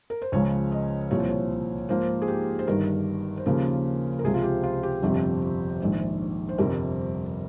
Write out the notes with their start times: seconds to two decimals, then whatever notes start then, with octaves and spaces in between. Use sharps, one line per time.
0.10 A#4
0.22 C5
0.32 C#2 C#3 F3 G#3 C#5
0.72 D#5
1.11 C2 A#2 F3 C4 C#5
1.20 C5
1.29 C#5
1.89 G#2 F3 A#3 C5
2.22 G#4
2.28 G4
2.59 C5
2.67 G1 G2 D#3 A#4
3.37 C5
3.46 D#2 C#3 F3 A#3 C#4 A#4
4.19 A#4
4.24 C#2 C3 F3 G#4
4.34 F4
4.43 G4
4.63 F4
4.83 G4
5.03 G1 F2 C3 F3 C4
5.80 A#1 G#2 D#3
6.49 C5
6.58 G1 F2 C3 G3 A#4